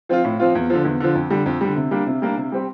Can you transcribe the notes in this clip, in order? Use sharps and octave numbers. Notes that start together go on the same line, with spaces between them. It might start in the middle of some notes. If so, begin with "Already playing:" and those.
F3 C4 F4
A2
F3 C4 F4
E2
D3 F3
E2
D3 F3
F2
D3 G3
F2
D3 G3
C3
G3 A#3 D4
C3
G3 A#3 D4
C3
G3 C4 G4